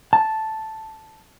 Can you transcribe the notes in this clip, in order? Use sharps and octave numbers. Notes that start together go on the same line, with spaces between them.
A5